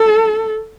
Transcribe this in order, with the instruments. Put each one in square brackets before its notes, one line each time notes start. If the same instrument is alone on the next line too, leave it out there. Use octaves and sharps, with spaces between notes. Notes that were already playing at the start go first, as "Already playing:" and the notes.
Already playing: [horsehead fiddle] A4